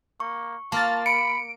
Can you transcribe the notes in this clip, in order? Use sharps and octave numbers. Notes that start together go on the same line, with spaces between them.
A#3 C#6
A#3 F4 A5 F6 A6
B5 C#7 D7